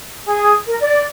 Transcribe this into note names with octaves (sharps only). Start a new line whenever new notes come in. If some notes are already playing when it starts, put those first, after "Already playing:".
G#4
A#4
D5